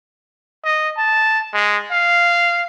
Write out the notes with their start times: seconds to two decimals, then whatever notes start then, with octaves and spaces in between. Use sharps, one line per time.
0.65 D#5
0.98 A5
1.53 G#3
1.92 F5